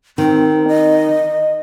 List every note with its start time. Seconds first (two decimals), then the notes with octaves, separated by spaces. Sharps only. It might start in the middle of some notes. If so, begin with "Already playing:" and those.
0.18 D#3 C4
0.68 D#5